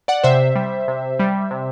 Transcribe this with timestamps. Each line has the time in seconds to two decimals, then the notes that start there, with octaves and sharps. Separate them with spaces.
0.08 D5 F#5
0.24 C3 C5 E5
0.56 G3
0.88 C3
1.20 G3
1.51 C3